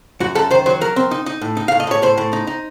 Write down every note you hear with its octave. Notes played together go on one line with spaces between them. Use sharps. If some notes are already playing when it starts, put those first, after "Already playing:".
F#2 F#4
F#2 A4
D#3 C5
F#3 C5
F#3 A#4
C4
D#4
D#4
A2
D#4
A2 F5
D#5
A2 C#5
A2 C5
A2
D#4
D#4